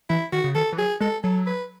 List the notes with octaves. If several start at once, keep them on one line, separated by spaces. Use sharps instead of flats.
E3 E4
D#3 F#4
C#3
D#3 A4
E3
F#3 G#4
G#3 A4
F#3 A4
B4